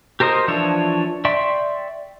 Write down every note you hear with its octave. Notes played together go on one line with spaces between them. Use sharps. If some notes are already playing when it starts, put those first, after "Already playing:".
G4 A#4 C5 D#5 D#6
E3 F3 D4 C#5 E5
D5 E5 G5 C6 C#6